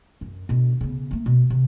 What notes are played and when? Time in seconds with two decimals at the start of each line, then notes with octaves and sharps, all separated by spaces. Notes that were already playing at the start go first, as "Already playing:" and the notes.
0.21 F#2
0.49 B2 D3
0.81 C#3 B3
1.11 A3 A#3
1.26 B2
1.50 C3